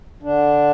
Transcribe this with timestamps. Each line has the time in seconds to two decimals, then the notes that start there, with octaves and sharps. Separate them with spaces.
0.22 D3 D4